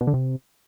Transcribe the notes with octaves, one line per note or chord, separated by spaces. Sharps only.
B2
D3
C3